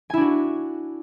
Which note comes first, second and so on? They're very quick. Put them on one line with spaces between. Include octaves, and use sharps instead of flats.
G#5 E4 D4 F#4